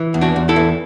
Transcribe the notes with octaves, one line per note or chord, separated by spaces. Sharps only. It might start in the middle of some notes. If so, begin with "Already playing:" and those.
Already playing: E3
E2
D4 F#4
E2
E4 A4
E3